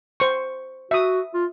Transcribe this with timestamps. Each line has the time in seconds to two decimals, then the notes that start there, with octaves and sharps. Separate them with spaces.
0.20 C5 C#6
0.91 F#4 E5 D#6
1.34 F4